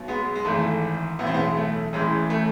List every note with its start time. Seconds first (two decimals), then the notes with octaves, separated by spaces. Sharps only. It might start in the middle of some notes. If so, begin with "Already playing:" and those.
Already playing: B1 B2
0.08 G#3 B3
0.35 G#3
0.45 G#1 G#2 E3 A3
1.19 B1 A2 E3 B3
1.27 C4
1.34 G#3 B3
1.57 A3
1.93 A1 A2 E3 G#3
2.30 A3